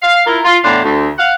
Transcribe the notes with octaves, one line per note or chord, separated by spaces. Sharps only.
F5
E4 F4 A#4
F4
E2 A2 D4 C5 F5
D2
F5 F#5